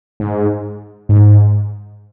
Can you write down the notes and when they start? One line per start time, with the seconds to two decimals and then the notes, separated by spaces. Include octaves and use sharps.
0.20 G#2
1.09 G#2